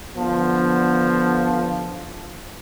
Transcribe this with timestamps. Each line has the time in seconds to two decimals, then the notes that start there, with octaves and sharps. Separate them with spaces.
0.15 D3 F3 B3